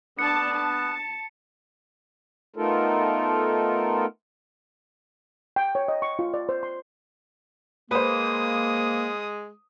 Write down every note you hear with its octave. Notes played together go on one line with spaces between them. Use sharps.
B3 D4 D5 A5 C#7
A5
A3 B3 D#4 F4 A4 A#4
G5
C#5
D#5
C#6
F4
D5
C5
C6
G#3 A#3 B4 C5 D#6